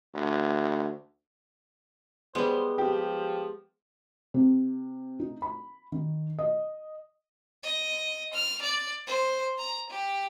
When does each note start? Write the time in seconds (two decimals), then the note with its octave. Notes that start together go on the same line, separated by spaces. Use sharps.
0.14 D2
2.35 G3 G#3 B3 C5
2.78 F3 G4
4.34 C3
5.20 D#4
5.42 B5
5.92 D#3
6.39 D#5
7.64 D#5
8.34 F6
8.62 D5
9.07 C5
9.58 A#5
9.90 G4